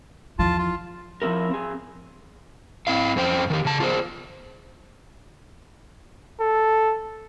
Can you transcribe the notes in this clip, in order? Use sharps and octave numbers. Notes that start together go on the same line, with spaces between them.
E2 F3 F4 A5
F4
F3 G#3 C4 E4 A#4
C4 G#4
C4 E4 F5
F2 C#4 C5 G5
D#3 F4 G4
C#3 A5
F4 G#4 C5
A4